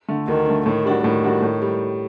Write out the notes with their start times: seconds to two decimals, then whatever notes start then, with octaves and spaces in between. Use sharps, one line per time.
0.08 D3 A3
0.27 D2 D#3
0.46 D3 A3
0.66 A2 D#3
0.85 G3 D4 F#4
1.04 A2 D#3
1.23 G3 D4 F#4
1.42 A2
1.62 G3